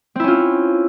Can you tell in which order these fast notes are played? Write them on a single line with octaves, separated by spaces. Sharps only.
C4 E4 C#4 F4